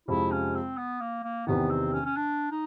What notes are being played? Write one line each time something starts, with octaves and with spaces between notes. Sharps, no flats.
F2 C3 F3 G#3 E4
C#4
C4
B3
A#3
A#3
E2 C3 D#3 B3
C4
C#4
C#4
D4
D#4